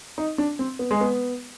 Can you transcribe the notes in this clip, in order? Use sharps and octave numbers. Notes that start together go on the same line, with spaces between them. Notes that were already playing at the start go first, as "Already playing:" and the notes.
D#4
D4
C4
B3
G#3
B3